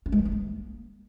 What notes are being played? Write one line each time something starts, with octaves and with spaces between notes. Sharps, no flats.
C#4
G#3
E3
G3
A#3